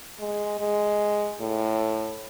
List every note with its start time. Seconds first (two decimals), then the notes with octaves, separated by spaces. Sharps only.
0.20 G#3
0.60 G#3
1.41 A2